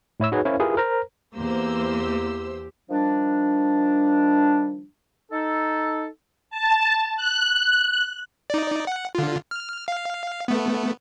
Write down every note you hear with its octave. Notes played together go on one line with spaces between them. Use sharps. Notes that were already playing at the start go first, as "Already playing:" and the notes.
A2 E4 C#5 E6
D#4 F#4 G#4 B4 C#5
C#4 E4 A#4 C5 C#5 F5
E4 F4 G4 G#4 A#4 B4
A#4 C5 A#5
E2 A#3 G4 C5 E6
D#3 F3 G3 D4
D#4 A4
A5
F#6
D#4 D5
F#5
D3 F4
F6
F5
A3 B3